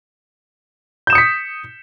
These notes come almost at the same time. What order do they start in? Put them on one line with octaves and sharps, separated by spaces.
G6 E7 D#6 C#7 B6